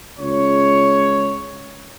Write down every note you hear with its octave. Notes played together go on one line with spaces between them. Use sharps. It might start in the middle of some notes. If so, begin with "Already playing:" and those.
C#2 C#5